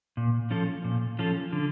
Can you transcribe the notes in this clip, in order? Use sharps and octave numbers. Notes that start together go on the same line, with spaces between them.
A#2
F3 C#4 F4 A4
A#2
F3 C#4 F4 A4
D3